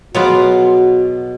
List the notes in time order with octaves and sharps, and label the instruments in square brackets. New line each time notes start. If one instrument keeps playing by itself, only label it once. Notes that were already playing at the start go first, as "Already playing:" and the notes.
[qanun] B2 G#4 D6 [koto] F#3 B3 F4 [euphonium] F#4